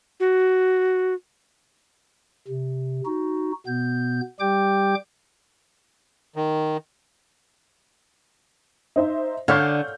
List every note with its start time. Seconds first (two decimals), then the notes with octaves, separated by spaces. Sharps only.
0.20 F#4
2.48 C3
3.05 D#4 F#4
3.67 B2 B3 G6
4.40 G3 G4 G5 D6 G6
6.36 D#3
8.96 D#4 C5 E5
9.48 D3 C#5 D5 F5 F#5 F6 G6